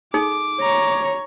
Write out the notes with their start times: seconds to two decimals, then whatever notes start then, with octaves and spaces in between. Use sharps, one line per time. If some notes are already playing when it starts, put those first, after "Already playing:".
0.14 D#4 G#4 A4 D6
0.61 C#5 A#5